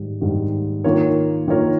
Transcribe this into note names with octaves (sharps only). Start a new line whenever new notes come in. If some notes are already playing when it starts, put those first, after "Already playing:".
Already playing: G#2 D#3 G3
G#2 D#3 G3
D#3 A#3 F4 A#4 C#5
D#3 A#3 F4 A#4 C#5